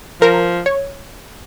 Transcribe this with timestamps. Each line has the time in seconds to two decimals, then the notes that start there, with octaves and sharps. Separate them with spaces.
0.21 F3 A#4
0.66 C#5